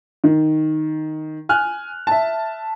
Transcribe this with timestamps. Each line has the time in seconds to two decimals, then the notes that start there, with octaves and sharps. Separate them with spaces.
0.24 D#3
1.49 G#5 F6 F#6
2.07 E5 A5